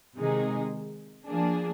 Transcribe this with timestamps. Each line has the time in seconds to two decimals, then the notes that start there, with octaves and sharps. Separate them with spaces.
0.16 C3 D#3 G#3 D#4 G#4
1.28 F3 A#3 D4 G#4